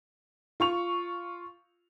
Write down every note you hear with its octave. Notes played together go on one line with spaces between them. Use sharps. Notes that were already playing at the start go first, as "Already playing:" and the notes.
F4 C#6 F7